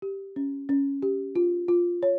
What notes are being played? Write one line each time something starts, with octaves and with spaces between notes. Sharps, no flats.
G4
C#4
C#4
G4
F4
F4
C#5